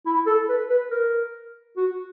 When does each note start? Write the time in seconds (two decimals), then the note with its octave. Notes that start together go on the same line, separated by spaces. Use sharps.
0.06 E4
0.27 A4
0.49 B4
0.70 B4
0.91 A#4
1.77 F#4